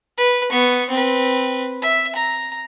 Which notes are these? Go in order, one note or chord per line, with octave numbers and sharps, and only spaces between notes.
B4
B3 C#6
C4 B4
E5
A#5